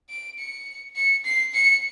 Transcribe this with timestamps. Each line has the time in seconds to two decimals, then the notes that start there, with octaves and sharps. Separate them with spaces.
0.09 D7
0.39 C#7
0.96 C#7
1.25 C7
1.54 C#7